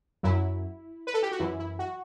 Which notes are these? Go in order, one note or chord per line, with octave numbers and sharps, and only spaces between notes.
F#2 F#3 E4
B4
A4
G4
F#4
F#2 E3 E4
E4
F#4